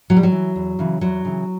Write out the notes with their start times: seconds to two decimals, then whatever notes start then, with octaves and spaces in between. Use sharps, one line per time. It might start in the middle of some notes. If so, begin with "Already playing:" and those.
0.10 A2 F#3
0.17 G3
0.23 F#3
0.32 E3
0.56 E2
0.79 C#3 E3
1.01 E2 F#3
1.25 C#3 E3